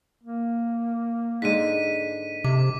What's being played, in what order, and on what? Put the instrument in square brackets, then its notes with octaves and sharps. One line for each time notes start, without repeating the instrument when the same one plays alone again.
[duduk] A#3
[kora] G#2 D3 G#3 [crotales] B6 D#7
[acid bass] C3 [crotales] D6